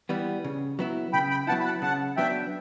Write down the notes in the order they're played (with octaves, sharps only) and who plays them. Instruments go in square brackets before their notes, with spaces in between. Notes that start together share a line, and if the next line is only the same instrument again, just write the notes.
[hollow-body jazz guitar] E3 G3 B3
C#3
F#3 B3 E4
[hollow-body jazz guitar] C#3 [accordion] G5 B5
[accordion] G5 B5
[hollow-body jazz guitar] F#3 B3 E4 [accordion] F#5 A5
[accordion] B5
F#5 A5
[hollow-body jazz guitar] C#3 [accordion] F#5 A5
[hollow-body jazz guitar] F#3 B3 D4 [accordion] E5 G5